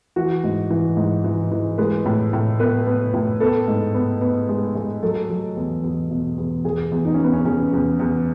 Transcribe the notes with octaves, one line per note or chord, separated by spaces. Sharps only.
E3 F#4
G#2
E3
G#2
E3
E3
G#3 B4
A2
A2
B3 B4
B3
A2
B3 A4
G#2
B3
B3
G#3
G#3
F#3 A4
F#3
E2
E2
B2
E2
E2 G#4
E2
D#4
E2 C#4
B3
C#4
E2 C#4
E2
E2